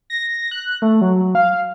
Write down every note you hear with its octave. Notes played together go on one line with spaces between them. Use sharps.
A#6
F#6
A3
F#3
F5